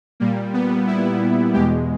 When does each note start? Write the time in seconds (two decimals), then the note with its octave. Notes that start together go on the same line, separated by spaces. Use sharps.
0.20 A#2 G3 A#3
0.54 B3
0.87 E4
1.54 E2 B2 G#3 G4